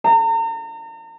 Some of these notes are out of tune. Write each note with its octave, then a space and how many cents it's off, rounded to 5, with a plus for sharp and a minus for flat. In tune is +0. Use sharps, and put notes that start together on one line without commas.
A#5 -40